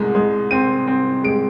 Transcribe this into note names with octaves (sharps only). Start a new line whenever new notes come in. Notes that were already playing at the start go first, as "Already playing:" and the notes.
Already playing: C2 G#3
G#3
C4 D#7
C4
G#3 D7